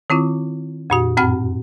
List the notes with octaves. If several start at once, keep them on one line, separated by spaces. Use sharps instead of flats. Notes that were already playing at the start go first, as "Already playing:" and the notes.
D#3 C4 E4 F4
F2 A#2 F#4
F#2 A2 C4 F#5 B5 F6